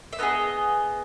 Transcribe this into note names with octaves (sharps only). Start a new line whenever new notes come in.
E5
B3 D#4 G#4 D#5